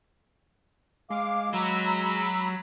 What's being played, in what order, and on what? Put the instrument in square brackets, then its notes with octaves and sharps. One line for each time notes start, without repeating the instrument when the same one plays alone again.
[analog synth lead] G#3 [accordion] F5 D6
[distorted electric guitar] F#3 [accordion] A#5 B5 E6